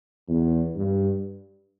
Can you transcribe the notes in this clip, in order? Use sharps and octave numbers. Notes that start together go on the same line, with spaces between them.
E2
G2